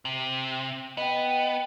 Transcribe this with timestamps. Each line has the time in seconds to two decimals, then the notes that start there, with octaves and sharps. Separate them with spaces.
0.05 C3
0.97 B3 D#5 G5